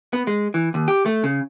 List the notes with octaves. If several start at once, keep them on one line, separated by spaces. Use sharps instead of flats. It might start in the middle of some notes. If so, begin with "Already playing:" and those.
B3
G#3
E3
D#2
G4
A3
C#3